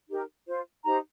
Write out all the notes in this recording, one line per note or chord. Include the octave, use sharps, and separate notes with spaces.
D#4 G4 A#4
F4 C5
D#4 G4 C5 A#5